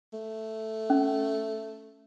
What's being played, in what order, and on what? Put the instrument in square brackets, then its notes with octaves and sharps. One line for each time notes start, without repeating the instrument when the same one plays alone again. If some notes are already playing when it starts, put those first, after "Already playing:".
[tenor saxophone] A3
[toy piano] C#4